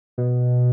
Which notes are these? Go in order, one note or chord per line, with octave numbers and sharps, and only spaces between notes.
B2